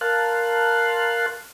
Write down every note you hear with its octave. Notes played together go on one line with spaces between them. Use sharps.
A#4 F5 A5 C6 F#6